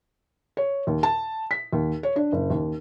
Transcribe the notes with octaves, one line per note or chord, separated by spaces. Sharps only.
C#5
D#2
A5
B6
D#2
C#5
D4
F#1
D#2